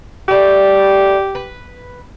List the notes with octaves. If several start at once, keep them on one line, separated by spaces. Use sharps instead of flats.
G3 A3 G4
B4